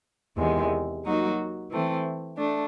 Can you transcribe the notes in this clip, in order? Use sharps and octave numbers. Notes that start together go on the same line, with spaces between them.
E2 C3 D#3 G#3
F#3 A#3 D#4 F#4
E3 A3 C4
A3 D4